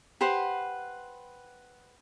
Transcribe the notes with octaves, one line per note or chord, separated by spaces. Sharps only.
G4 B4 C5 F#5